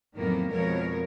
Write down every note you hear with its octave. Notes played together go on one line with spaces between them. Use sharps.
F2 A2 D#3 F#3 A#3 B3
F2 B2 F3 G#3 A#4 C#5